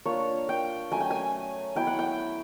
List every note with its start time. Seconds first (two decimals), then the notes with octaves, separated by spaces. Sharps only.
0.06 A#3 D4 F4 C#5
0.49 G5
0.92 F#3 A3 C#4 G#5
1.00 G5
1.11 G#5
1.76 F#3 B3 E4 G5
1.87 F#5
1.99 G5